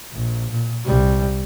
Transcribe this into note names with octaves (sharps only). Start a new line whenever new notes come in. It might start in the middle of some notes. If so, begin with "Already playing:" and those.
A#1
A#2
C2 G3